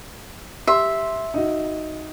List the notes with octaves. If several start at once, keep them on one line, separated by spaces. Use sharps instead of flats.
G4 E5 C6
D#4 F#4